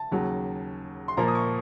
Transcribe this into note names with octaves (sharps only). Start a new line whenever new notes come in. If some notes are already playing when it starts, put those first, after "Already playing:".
Already playing: A5
D#2 C#3 F#3
C6
A#2 F3 A#3 A#5
D#6
C#6